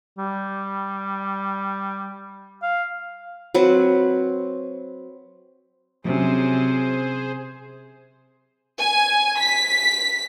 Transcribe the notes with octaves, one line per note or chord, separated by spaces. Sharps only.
G3
F5
F#3 C4 B4
C3 F#3 C#4 G#4 C5
G#5
B6